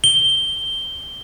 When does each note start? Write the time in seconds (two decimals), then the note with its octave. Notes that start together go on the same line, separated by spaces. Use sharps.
0.04 G7